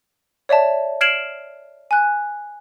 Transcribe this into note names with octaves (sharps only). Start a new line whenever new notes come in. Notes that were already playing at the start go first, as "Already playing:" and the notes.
C#5 D5 E5 A5
F6 G#6 C7 D7 E7 F#7
G#5 F#6